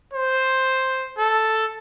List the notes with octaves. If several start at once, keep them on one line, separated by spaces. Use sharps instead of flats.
C5
A4